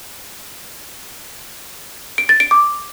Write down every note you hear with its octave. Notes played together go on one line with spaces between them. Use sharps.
D7
A6
D7
D6